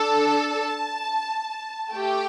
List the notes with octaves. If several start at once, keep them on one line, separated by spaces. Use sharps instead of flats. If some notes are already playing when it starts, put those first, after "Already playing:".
Already playing: D4 A4 A5
A3 G4 G5